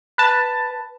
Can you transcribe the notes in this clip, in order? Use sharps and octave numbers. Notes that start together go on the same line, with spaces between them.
B4 A5